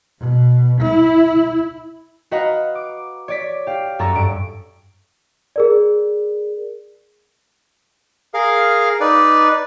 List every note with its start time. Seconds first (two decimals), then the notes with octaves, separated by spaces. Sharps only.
0.19 B2
0.82 E4
2.31 F#4 B4 D#5 F5 F#5 A#5
2.75 D6
3.28 C#5 D5 B6
3.67 G4 F5
3.99 F#2 F#4 A4 A#5 C#6 A6
4.15 G2 D7
5.56 G#4 A#4 D5
8.34 G#4 A#4 F5
9.01 D#4 B4 D5